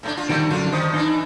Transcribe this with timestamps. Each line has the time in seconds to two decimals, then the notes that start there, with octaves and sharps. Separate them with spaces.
0.03 A2 A3 D4
0.17 F4
0.29 D3 D#3 F3 G3 A3
0.50 F#2 D3 F#3 D4 F4
0.73 D#3 C5 D#5
0.94 E3 D4 D#4